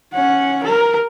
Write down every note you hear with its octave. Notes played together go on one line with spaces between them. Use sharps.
C#4 F#5
A#4